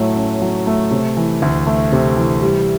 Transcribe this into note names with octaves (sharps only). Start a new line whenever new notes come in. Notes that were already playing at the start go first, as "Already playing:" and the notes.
Already playing: A2 F#3 A3
C#4
F#3
A3
C3
E3
D2
A3
C3
E3
G3